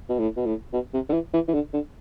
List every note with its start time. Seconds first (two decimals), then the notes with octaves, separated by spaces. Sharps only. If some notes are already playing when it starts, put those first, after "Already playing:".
0.09 B2
0.19 A2
0.37 B2
0.46 A2
0.73 B2
0.94 C3
1.09 D3
1.13 E3
1.34 E3
1.48 E3
1.54 D3
1.73 D3